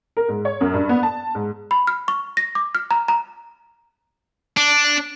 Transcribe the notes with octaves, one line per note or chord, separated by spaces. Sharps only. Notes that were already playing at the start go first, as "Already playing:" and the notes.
A#4
G#2
C#5
F#2
G2
B3
A5
G#2
B5
F6
C#6
A#6
D6
F6
A#5
A#5
D4